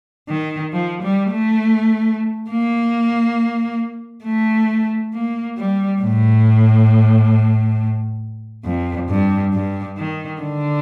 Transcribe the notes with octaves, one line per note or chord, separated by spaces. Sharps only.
D#3
F3
G3
A3
A#3
A3
A#3
G3
A2
F2
G2
G2
D#3
D3